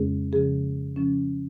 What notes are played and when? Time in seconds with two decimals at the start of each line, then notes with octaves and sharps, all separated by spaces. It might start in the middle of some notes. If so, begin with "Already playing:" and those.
Already playing: F2 C#3 G#3 C#4 G#4
0.32 C#3 F3 C#4 G#4
0.96 C#3 F3 C#4